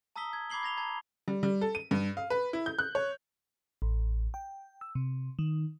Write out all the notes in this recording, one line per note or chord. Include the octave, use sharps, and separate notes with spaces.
A5 A#5 D#6 E6 B6 G7
G#6
B5 D6 G#6 C7 F#7 G7
G#6 A#6 F7 G7
A5 A#5 G#6
G3
G3
A4
D#7
G2
F5
B4
E4
G6
F#6
C#5
A1
G5
E6
C3
D#3